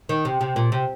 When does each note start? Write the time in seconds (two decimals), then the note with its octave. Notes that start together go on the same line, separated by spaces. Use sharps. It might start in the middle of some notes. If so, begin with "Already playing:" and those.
0.09 D#3
0.25 C3
0.41 C3
0.56 A#2
0.72 C3